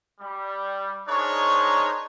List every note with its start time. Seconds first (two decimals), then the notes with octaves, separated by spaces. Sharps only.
0.20 G3
1.08 D4 D#4 G#4 A#4 C5 C#5